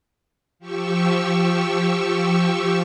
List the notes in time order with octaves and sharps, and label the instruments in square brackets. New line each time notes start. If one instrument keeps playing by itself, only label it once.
[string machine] F3 G4 C#6 E6